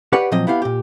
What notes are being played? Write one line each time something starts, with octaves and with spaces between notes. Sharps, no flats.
G4 B4 C#5 D5 F#5
A#2 F3 F#3 C4 D#5
B3 E4 G4 F5
A#2 G4